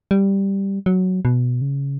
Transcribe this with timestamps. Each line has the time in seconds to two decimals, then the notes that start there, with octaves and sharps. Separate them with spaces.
0.11 G3
0.86 F#3
1.25 B2
1.61 C#3